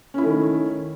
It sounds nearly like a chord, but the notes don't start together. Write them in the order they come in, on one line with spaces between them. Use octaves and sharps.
C#4 E4 A3 D#3